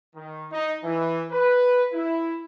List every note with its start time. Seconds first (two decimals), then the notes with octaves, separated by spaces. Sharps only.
0.15 D#3
0.52 D#4
0.84 E3
1.31 B4
1.93 E4